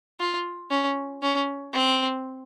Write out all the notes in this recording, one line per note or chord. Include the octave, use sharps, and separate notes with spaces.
F4
C#4
C#4
C4